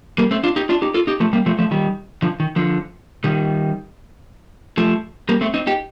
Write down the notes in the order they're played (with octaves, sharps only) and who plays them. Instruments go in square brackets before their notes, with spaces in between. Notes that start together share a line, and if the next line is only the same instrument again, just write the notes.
[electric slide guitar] G3 A#3
A3 C4
D4 F4
D#4 G4
D4 F4
D#4 G4
F4 A4
D#4 G4
F3 A3
G3 A#3
F3 A3
F3 A3
D#3 G3
D3 F3
D#3
D3 F3
D#3 G3
F3 A3
G3 A#3
A3 C4
C4 D#4
D#4 G4